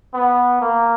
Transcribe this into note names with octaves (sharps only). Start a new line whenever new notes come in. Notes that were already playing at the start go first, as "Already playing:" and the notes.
B3
A#3